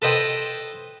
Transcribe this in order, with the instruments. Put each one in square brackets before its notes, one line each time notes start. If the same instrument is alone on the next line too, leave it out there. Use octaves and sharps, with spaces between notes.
[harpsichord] A4 B4 C5 D#5 G5